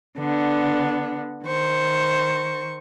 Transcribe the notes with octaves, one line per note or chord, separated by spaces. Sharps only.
D3 B3 D4
D#3 C5 C#6